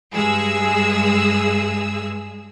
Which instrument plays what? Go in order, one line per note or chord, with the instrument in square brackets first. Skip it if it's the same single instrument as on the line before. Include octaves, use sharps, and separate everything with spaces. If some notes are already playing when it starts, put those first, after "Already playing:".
[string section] G2 G#3 G#4 E6